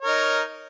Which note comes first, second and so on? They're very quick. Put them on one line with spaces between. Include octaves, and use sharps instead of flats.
C#5 A#4 D#4